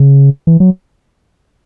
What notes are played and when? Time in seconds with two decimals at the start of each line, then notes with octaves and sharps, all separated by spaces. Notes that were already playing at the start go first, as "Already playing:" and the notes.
Already playing: C#3
0.47 E3
0.60 F#3